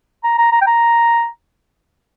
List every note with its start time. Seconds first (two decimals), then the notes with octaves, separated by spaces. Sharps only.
0.23 A#5
0.38 A#5
0.52 A#5
0.61 G5
0.67 A#5